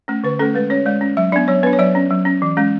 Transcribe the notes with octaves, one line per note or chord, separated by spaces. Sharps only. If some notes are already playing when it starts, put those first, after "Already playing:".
A3 C#4
D3 B4
A3 C#4 A4
G#3 B4
C#4 C#5
G#3 D5
C#4
F#3 E5
B3 D4 D5
F#3 C#5
B3 D4 B4
C#5
F#3 D5
C#4
F#3
C#4
E3
G#3 C#4